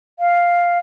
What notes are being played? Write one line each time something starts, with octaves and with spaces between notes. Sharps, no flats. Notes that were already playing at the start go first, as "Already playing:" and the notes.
F5